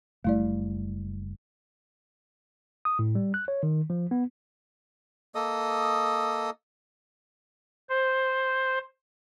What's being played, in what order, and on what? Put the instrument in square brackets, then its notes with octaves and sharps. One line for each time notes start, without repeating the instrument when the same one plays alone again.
[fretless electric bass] F#1 G3 [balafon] A3 E4 D5
[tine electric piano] D#6
A2
G3
F#6
C#5
D#3
F3
B3
[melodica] A#3 A4 D#5 D#6
[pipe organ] C5